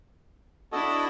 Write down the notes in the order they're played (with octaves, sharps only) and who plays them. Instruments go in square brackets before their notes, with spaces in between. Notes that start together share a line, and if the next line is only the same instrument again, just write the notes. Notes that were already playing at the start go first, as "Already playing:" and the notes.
[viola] D4 E4 [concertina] F#4 A4 D#5